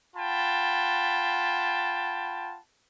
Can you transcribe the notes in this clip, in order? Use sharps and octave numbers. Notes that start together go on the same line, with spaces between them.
F4 F#5 G5 A5 B5